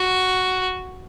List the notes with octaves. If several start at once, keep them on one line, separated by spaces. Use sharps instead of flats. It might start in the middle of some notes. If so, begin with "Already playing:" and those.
Already playing: F#4